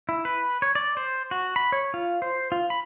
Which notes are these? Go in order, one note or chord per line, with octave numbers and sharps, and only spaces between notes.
E4
B4
C#5
D5
C5
F#4
B5
C#5
F4
C5
F4
B5